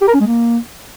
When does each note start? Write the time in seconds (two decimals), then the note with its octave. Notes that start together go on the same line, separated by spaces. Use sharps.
0.01 G4
0.08 A#4
0.14 C#4
0.20 G#3
0.27 A#3